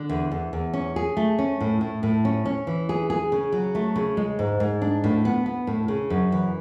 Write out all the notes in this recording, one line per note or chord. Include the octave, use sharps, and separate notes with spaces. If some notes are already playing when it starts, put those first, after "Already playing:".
Already playing: D3
E2
E2
E2
C#4
G#4
A3
C#4
A2
A2
A2
C#4
C#4
E3
G#4
G#4
C#3
F#3
A3
C#3
G#3
G#2
G#2
D4
A2
B3
B3
A2
C#3
F#2
E3